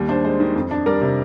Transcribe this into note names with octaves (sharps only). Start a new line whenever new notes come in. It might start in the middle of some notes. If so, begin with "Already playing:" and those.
Already playing: D#2 G3
D4 C5
G#3 C5
D#3
F2
D4
G3 A#4 D5
C3